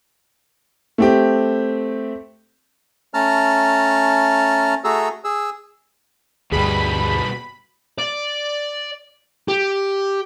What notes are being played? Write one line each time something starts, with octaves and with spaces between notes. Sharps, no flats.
A3 C4 G4
A3 C#4 A5 A#5 F6
A3 F#4 G#4 A4 A#5 E6
G#4 E6
D2 G2 B2 G3 G#4 B5
D5
G4